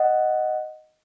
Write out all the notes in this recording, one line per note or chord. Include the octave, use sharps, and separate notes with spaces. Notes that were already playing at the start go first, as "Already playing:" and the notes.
Already playing: D#5 F#5